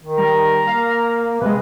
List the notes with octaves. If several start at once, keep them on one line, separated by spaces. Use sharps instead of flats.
D#3
G3 A#5
A#3 F5
C3 G#3 B4